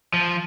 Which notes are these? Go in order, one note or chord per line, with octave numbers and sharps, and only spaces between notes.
F3